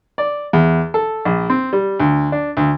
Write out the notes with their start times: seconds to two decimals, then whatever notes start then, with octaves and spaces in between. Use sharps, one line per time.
0.18 D5
0.53 E2
0.94 A4
1.25 A#1
1.50 C4
1.73 G3
2.00 D2
2.32 D4
2.57 D2